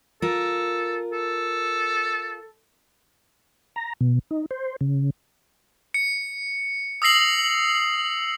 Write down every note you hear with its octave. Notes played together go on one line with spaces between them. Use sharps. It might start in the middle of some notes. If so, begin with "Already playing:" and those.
F4 A4 A#4
A4
A#5
B2
D#4
C5
C#3
C#7
D#6 E6 A#6 C7 F#7